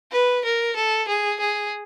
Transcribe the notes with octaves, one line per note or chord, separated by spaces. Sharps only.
B4
A#4
A4
G#4
G#4